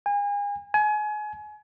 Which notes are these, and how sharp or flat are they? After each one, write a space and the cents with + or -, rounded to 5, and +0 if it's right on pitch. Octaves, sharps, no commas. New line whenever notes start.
G#5 -35
G#5 +30